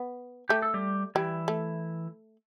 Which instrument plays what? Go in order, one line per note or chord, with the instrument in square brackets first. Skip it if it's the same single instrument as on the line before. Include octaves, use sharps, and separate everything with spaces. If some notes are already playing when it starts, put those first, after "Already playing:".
Already playing: [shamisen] B3
[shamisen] A3 [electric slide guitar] G4
[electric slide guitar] A4
G3 G4
[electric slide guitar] E3 E4 [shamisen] G3
[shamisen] A3